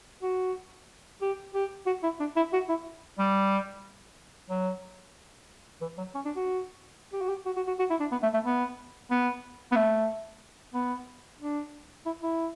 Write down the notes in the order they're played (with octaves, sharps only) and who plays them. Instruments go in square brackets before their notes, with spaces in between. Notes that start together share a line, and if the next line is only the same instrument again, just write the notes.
[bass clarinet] F#4
G4
G4
F#4
E4
D4
E4
F#4
E4
G3
F#3
E3
F#3
C#4
D4
F#4
G4
F#4
G4
F#4
F#4
F#4
F#4
E4
D4
B3
A3
A3
B3
B3
B3
A3
B3
D4
E4
E4